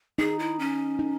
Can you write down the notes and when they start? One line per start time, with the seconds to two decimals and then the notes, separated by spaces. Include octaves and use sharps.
0.18 D#4 G#4
0.39 E4
0.59 C#4
0.99 D#4